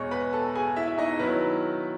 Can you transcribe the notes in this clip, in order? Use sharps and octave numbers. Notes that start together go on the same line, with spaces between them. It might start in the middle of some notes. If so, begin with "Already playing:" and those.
Already playing: E2 B2 G#3 C#5 D#5 C#6
B4 B5
A4 A5
G#4 G#5
E4 E5
E5
D#4 D#5
D#3 F#3 C#4 E4 B4